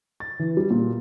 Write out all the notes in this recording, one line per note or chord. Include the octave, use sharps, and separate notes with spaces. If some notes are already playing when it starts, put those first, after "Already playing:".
A6
E3
G3
A#2